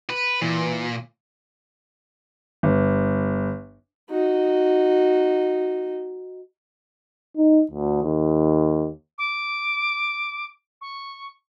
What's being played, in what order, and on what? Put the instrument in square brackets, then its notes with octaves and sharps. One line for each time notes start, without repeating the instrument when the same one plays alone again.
[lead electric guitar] B4
[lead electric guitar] A#2 [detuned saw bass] E3
[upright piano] G1
[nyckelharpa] D#4 F#4
[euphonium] D#4
D2
D#2
[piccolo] D6
C#6